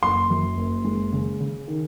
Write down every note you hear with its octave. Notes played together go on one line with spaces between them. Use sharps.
F#1 C6
F#2
F#1
G#3
C#3
C#3
D#3